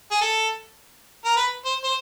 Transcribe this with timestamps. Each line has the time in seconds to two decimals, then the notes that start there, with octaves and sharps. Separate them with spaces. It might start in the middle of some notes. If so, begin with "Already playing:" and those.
0.11 G#4
0.21 A4
1.25 A#4
1.37 B4
1.65 C5
1.83 C5